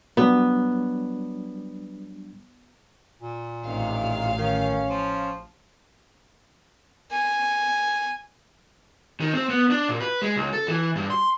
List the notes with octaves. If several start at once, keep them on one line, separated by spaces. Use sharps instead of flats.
F#3 G3 B3 D4
A#2
A1 C3 D#3 F5
D#3 C#4
F3
G#5
D#3
C4
B3
D4
A#2
B4
G#3
C#2
A4
E3
G2
C6